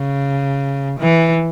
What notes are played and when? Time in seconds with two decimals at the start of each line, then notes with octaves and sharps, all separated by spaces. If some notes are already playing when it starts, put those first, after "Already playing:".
Already playing: C#3
0.99 E3